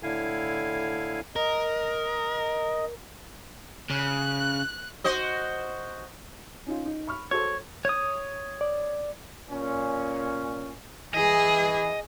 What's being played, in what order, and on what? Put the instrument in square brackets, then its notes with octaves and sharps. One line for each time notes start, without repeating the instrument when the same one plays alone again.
[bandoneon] A2 D3 E4 F5 G#5
[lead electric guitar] A#4 [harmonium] D#5
[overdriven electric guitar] C#3 [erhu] F#6
[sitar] F#4 C5 D#5
[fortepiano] C#4 D#4 F4
D#4
B5 C#6 F6
[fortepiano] F#4 A4 C5 [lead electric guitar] C#5
[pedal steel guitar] C#5 D#6
[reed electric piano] D5
[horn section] A#2 C#4
[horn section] E3 [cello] G#4 [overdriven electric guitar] D#5